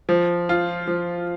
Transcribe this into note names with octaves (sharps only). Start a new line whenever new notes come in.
F3
F4
F3